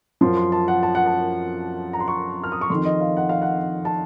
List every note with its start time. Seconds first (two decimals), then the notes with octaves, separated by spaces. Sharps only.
0.21 F#2 F3 C6
0.37 C6
0.52 A5
0.68 F#5
0.83 A5
0.95 F#5
1.06 A5
1.93 A#5
2.00 C6
2.08 C#6
2.44 F6
2.52 D#6
2.61 C#6
2.70 F2 D#3 C6
2.85 D#5
3.01 F5
3.17 F#5
3.29 F5
3.42 F#5
3.85 A5